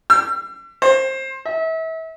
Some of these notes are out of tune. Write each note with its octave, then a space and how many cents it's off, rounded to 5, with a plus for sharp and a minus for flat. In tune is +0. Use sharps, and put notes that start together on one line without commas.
E6 +40
C5 +20
E5 -35